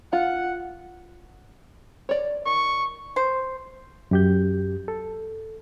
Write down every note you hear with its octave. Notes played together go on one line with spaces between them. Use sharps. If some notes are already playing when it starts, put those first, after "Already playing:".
F4 F#5
C#5 D5
D#3 C#6
C5
F#2 G4 G6
A4